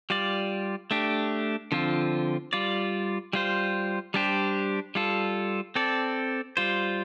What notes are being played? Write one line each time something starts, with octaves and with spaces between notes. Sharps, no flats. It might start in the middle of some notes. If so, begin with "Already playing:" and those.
G3 F4 D5
A3 D4 G4
D3 F3 C4 F4
G3 F4 D5
G3 F4 C5
G3 D4 G4 C5
G3 F4 A4
C4 A4 D5
G3 F4 C5